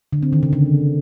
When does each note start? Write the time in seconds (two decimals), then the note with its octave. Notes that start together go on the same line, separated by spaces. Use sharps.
0.13 D3
0.23 C4
0.33 D#3
0.43 C#3
0.53 D3